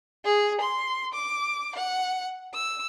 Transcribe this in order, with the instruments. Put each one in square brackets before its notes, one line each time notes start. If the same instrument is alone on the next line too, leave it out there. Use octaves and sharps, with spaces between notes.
[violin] G#4
C6
D6
F#5
E6